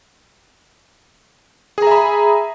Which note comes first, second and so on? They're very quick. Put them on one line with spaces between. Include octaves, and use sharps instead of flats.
G#4 A#5 E5 B5